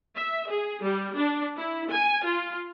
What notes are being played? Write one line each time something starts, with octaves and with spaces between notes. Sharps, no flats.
E5
G#4
G3
D4
E4
G#5
F4